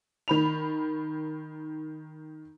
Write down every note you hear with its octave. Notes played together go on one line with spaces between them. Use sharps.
D#3 B5 F7